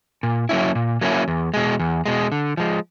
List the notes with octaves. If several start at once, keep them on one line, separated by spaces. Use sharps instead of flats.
A#2
F#3 A#3 C#4 E4
A#2
F#3 A#3 C#4 E4
E2
B2 G#3
E2
B2 G#3
D3
F3 G#3